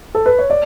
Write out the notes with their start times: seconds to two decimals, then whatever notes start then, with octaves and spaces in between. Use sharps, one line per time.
0.15 A4
0.26 B4
0.39 C#5
0.50 D5